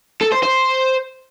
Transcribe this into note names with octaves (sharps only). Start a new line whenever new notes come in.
A4
C5
C5